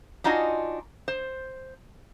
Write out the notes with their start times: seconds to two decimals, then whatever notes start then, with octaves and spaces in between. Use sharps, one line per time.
0.24 D4 D#4 F4 F#4 D#5 G#5
1.08 C5